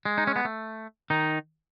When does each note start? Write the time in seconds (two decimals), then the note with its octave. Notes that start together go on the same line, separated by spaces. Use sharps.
0.05 G#3
0.18 D#4
0.27 C#4
0.36 B3
0.45 A3
1.10 D#3 D#4